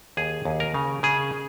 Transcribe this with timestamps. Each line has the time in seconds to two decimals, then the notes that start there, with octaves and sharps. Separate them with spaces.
0.17 D#2 G#4
0.45 D#2
0.60 A#4
0.74 C#3
1.03 C#3 G#4